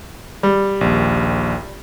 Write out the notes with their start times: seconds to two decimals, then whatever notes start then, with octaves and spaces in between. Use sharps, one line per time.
0.43 G3
0.81 A#1 D#2